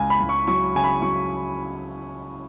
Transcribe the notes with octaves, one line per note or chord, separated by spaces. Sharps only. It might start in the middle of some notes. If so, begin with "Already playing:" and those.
Already playing: C#2 G#5
B5
C#2
C#6
F#3 C#6
C#3 G#5
B5
F#3 C#6